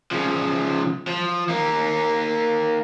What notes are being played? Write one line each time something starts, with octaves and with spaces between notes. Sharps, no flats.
C#3 F3
F3
A#3 D#4